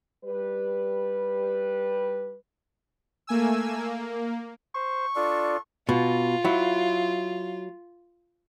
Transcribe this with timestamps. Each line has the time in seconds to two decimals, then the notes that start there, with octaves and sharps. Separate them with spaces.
0.25 G3 B4
3.27 A3 A#3 G#5 E6
3.77 A#3
4.75 C5 C#6
5.16 D4 F4 A4 D5
5.89 B2 F4
6.44 F#3 E4